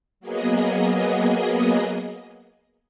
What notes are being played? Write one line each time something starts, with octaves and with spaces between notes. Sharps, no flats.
F#3 A#3 B3 G#4 D#5